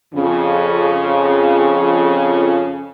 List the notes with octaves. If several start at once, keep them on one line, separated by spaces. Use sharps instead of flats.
F2 C#3